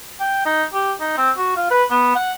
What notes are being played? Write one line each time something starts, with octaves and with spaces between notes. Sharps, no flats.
G5
D#4
G4
D#4
C4
F#4
F4
B4
B3
F#5